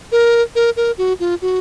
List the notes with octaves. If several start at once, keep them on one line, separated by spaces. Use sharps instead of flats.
A#4
A#4
A#4
F#4
F4
F#4